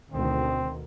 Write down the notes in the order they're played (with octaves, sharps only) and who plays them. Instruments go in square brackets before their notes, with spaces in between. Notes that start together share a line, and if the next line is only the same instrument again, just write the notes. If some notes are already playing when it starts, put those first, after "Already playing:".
[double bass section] D2 B2 D#3 [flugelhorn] C4